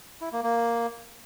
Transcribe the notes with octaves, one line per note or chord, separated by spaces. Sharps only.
E4
A#3
A#3